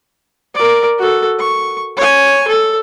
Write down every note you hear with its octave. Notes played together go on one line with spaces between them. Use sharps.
A#4 D5
F#4 A4
C#6
C#5 G#5
A4